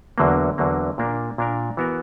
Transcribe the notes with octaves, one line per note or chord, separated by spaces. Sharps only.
E2 D3 F#3 A#3
E2 D3 F#3 A#3
A#2 A#3 D4 A#4
A#2 A#3 D4 A#4
E3 B3 F#4 A#4